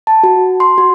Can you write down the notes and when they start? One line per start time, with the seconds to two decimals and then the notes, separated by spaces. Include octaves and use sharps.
0.07 A5
0.23 F#4
0.60 C6
0.78 F#4